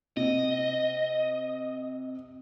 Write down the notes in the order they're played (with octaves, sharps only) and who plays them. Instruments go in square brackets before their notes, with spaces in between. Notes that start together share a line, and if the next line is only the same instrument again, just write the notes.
[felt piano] C3 [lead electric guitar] D#5